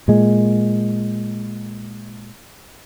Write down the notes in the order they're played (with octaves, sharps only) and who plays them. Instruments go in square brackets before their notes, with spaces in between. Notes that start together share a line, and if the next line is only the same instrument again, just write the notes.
[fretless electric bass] A#2 G#3